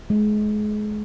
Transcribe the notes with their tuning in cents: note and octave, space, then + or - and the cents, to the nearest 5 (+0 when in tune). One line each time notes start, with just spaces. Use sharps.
G#3 +30